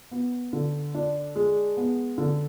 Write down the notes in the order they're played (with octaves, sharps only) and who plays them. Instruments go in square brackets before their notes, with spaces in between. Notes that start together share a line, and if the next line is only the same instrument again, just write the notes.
[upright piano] B3
D3
D4
G#3
B3
D3